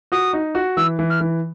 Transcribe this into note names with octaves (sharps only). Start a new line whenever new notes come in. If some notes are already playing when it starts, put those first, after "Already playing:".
F#4 D#6
D#4
F#4
E3 E6
E3
F6
E3